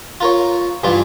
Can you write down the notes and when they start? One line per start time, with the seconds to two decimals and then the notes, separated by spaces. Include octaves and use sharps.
0.21 F4 A#4 C#5
0.83 G2 E3 D4 F4